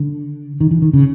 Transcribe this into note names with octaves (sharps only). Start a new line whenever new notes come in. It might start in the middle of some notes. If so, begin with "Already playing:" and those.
Already playing: D3
D#3
E3
D#3
C#3